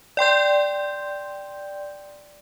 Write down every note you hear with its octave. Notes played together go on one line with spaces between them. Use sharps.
D5 G5 C6 G6